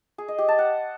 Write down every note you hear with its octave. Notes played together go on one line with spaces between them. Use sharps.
G#4
D#5
G4
A5
F#5